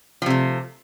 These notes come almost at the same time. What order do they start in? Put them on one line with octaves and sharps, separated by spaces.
F3 C3 A3